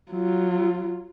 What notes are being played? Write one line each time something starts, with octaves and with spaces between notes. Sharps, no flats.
F#3 F4